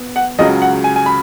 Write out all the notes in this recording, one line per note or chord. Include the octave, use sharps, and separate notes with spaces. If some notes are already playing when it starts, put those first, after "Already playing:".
Already playing: B3
F#5
C#2 C#3 F#3 D#5
F#5
G#5
G#5
B5